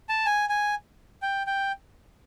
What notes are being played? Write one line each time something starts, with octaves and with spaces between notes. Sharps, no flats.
A5
G#5
G#5
G5
G5